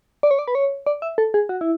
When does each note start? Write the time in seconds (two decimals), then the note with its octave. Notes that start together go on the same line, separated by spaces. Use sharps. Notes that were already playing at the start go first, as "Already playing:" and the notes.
0.23 D5
0.31 C#5
0.39 D5
0.48 B4
0.55 C#5
0.87 D5
1.02 E5
1.18 A4
1.34 G#4
1.49 F#4
1.61 E4